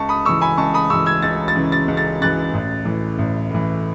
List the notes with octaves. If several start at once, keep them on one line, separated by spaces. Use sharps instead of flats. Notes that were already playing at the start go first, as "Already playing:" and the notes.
Already playing: C#2 A5 C#6
B5 D#6
C#3 E3 C#6 E6
G#5 B5
C#2 A5 C#6
B5 D#6
C#3 E3 C#6 E6
E6 G#6
C#2 A6
A6
C#3 E3
A6
C#2
A6
C#3 E3 F#6 A6
A1
A2 E3
A1
A2 E3